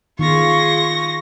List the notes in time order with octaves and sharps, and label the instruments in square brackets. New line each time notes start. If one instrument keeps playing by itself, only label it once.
[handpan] D#3 B3 [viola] F4 G#4 [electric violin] C#6 A#6